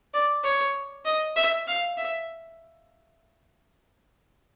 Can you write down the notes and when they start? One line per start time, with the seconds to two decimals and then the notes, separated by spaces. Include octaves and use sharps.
0.14 D5
0.44 C#5
1.05 D#5
1.36 E5
1.67 F5
1.97 E5